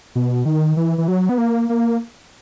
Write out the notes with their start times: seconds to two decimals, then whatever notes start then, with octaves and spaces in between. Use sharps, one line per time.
0.15 B2
0.45 D#3
0.77 E3
0.98 E3
1.08 F#3
1.29 B3
1.38 A#3
1.69 A#3